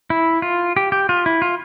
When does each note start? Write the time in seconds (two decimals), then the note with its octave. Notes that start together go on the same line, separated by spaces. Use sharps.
0.10 E4
0.42 F4
0.77 G4
0.92 G4
1.09 F4
1.26 E4
1.42 F4